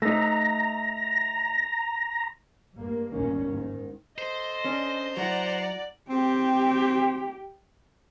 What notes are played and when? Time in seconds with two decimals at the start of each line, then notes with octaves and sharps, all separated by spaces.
0.02 A3 D#4 A#5
2.77 G2 A#3
3.12 G1 D#2 A#2 D#3 A#3 C#4
3.50 G#2 D#3
4.18 A4 C5 D#5
4.65 C#4 D4
5.17 F#3 E4 D5 F#5 A#5
6.10 C4 G4 G5